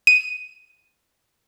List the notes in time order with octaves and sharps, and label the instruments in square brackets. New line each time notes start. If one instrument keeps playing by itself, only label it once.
[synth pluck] D#7